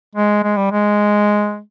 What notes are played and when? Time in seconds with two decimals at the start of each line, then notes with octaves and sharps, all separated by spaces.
0.15 G#3
0.43 G#3
0.57 G3
0.72 G#3